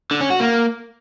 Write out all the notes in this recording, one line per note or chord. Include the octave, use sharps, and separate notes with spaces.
D3
C#4
F#4
A#3